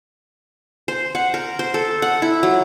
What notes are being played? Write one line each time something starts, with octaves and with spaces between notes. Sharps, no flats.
C5
F#5
A#4
C5
A4
F#5
E4
F#3